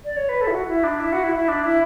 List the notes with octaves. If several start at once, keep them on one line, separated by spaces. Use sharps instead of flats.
D5
C#5
B4
A4
E4
F#4
E4
D4
E4
F#4
E4
E4
D4
E4